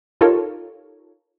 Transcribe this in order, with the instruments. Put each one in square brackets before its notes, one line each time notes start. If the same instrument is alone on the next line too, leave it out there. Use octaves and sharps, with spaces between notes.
[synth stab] D#4 F4 G4 A4 A#4 C#5